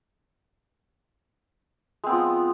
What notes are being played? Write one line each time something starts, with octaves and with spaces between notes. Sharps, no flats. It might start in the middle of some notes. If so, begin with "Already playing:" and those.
F3 G#3 B3 C4